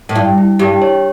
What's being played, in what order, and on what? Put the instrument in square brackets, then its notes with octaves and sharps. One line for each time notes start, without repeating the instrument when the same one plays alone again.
[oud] A2
[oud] G2 [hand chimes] E4
[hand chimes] E4
[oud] G2 [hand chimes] G4
[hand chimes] C#5